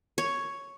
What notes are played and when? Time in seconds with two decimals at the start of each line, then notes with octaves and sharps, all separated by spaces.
0.18 C#5